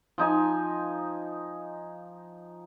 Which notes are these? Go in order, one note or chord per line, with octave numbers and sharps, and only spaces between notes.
F3 D#4 G#5